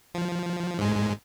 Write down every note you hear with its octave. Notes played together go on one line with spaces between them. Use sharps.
F3
G#2 G#3